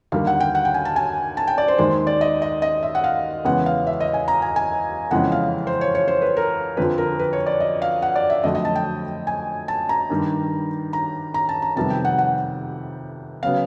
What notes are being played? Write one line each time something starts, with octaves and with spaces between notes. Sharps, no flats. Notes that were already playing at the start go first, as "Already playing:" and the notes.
D#2 D3 G3 A#3 F5
F#5
G5
F#5
G5
G#5
A5
G#5
A5
G5
D5
C5
D#2 D#3 G#3 C5
D5
D#5
D#5
D#5
E5
F#5
F5
E2 C#3 E3 G#3 B3 F#5
F5
E5
D#5
G#5
A#5
G#5
G#5
F2 C#3 E3 G#3 B3 F#5
F5
C5
C#5
C#5
C5
B4
A#4
F2 D3 F3 B4
A#4
B4
C#5
D5
D#5
F5
F#5
D5
E5
F2 D3 F#3 A3 D#5
D#5
A5
G5
G#5
A5
A#5
G2 D#3 G3
A#5
A#5
A5
A#5
F2 C3 D#3 G3 B3 A5
G5
F#5
F#5
C#3 F#3 B3 F5